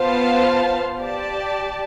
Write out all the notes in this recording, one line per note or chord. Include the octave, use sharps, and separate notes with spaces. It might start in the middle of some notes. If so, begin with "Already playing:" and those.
Already playing: B3 F4 C5 F5 A5
G4 D5 A5